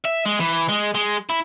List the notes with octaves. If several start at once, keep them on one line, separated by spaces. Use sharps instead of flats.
E5
G#3
E3
G#3
G#3
E4